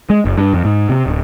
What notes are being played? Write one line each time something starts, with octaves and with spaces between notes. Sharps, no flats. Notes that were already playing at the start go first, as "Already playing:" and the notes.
G#3
F#1
G2
F2
G#2
C3
D1